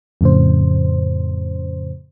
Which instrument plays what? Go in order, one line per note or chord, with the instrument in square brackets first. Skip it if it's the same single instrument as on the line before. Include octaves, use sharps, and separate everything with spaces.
[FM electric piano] F2 A2 C#3 C5